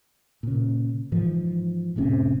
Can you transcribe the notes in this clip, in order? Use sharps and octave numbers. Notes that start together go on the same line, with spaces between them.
A#2 C#3
G#2 E3 F3
F1 A2 C3 C#4